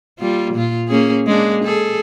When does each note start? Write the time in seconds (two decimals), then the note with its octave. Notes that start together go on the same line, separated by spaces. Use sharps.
0.19 G3 A#3 F4
0.54 A#2 F4
0.88 A#3 C#4 G#4
1.27 G#3 A#3 D4
1.64 G#4 A4